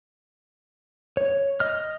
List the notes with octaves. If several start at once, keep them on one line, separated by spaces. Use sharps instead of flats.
C#5
D#5 F6